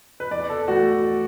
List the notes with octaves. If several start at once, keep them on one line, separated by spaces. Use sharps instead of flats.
B4
E2 D5
A4
E3 A3 F#4